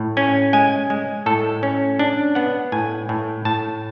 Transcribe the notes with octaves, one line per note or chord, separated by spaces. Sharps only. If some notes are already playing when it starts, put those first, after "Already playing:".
Already playing: A2
C#4 G#5
G#3 G#5
G#3
A2 A4
C#4
D4
B3 F#5
A2 G#5
A2
A2 A5